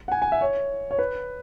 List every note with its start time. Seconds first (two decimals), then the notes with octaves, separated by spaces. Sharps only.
0.08 F#5
0.12 G#5
0.22 G#5
0.32 E5
0.41 C#5
0.91 C#5
0.99 B4